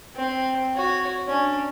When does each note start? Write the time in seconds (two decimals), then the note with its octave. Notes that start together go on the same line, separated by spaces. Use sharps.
0.15 C4
0.74 F#4 C#5
1.28 C#4 D4